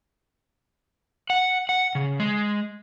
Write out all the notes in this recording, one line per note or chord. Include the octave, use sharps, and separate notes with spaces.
F#5
F#5
C#3
G#3